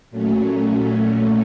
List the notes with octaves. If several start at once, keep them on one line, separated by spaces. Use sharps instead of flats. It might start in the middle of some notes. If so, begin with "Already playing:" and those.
A#2 F#3 A3 C#4